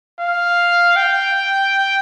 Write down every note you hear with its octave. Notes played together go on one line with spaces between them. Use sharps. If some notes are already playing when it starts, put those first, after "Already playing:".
F5
G5